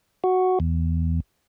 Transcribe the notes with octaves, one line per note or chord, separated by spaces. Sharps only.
F#4
E2